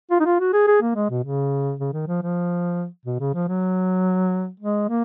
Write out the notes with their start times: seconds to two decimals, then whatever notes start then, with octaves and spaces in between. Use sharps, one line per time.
0.11 F4
0.20 D#4
0.25 F4
0.40 F#4
0.53 G#4
0.67 G#4
0.82 A#3
0.95 G#3
1.10 B2
1.24 C#3
1.80 C#3
1.93 D#3
2.08 F3
2.23 F3
3.06 B2
3.20 C#3
3.34 F3
3.48 F#3
4.60 G#3
4.89 A#3